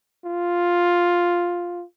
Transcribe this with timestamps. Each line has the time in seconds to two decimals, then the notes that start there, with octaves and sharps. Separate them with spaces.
0.25 F4